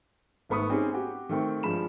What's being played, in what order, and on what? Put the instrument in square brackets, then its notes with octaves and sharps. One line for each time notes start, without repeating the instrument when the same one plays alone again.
[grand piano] G#1 A3 B3 B5 C#6 D#6
C4 C#4 D#4 G4 G#4
F#4 G4
D#3 A3 C4 G5 C#6
G2 F3 G#3 B5 E7